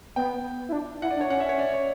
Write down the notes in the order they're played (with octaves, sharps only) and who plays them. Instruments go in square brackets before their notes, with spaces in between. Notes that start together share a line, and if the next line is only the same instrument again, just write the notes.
[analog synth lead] B3 [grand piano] G5
[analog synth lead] E4
D4
[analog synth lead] E4 [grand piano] F#5
[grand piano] D5
[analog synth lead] D4
[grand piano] C#5
[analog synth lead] C#4 [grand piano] F#5
[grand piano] E5
C#5
D5
C#5